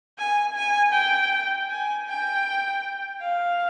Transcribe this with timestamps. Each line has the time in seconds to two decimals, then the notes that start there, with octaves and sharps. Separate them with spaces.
0.18 G#5
0.55 G#5
0.93 G5
1.69 G#5
2.07 G5
3.21 F5